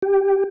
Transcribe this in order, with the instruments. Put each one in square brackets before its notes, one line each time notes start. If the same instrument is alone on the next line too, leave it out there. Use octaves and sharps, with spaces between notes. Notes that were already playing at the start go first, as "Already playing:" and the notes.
[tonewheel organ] G4